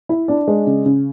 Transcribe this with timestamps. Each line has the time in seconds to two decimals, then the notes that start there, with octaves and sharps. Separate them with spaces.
0.09 E4
0.28 D4 D5
0.48 G#3
0.67 C#3
0.86 C#3